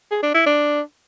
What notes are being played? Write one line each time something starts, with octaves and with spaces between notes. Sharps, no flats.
G#4
D4
E4
D4